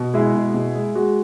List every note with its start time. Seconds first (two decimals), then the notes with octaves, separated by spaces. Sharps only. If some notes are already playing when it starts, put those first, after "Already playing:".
Already playing: B2
0.14 G#3 E4 G#4
0.34 B2
0.54 B2
0.75 G#3
0.95 G#3 F#4